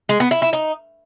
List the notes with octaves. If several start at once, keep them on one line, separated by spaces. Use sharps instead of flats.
G#3
B3
E4
E4
D#4